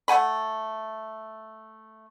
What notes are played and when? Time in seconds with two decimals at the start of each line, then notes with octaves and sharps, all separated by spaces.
0.08 A3 F#5 G#5 B5